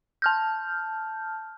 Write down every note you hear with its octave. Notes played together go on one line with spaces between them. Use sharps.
A5 F6 G6